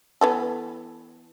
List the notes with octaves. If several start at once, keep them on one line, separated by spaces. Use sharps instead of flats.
E3 B3 A4